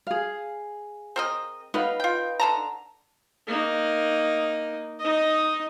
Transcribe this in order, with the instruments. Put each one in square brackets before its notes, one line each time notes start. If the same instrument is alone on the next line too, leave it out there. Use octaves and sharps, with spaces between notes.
[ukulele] G#4 F5
[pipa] C4 A#4 D#5
[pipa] B3 [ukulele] D#4 B4 F5
[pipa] F4 G5
D3 A5 A#5
[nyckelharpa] A#3 D#4
D#4 D#5